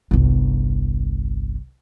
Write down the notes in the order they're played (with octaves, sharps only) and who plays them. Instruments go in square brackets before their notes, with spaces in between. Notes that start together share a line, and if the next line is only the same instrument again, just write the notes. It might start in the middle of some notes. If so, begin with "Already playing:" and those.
[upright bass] G1 C2